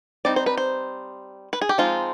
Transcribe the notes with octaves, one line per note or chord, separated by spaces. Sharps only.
G3 C4 D#4 D5
C5
B4
C5
B4
G#4
G4
F3 G#3 C4 D#4 F4